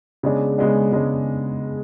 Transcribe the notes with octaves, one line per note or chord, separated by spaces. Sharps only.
C#3 G#3 B3 D4
C#3 G#3 B3 D4
C#3 G#3 B3 D4